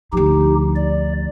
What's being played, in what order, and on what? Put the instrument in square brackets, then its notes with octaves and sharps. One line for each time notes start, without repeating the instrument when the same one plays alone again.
[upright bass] D2 F3 [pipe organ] D#4 G4
[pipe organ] D5